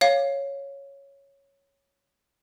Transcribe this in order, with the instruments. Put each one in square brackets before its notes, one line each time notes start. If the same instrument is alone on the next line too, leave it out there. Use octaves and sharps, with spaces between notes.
[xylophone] C#5 F5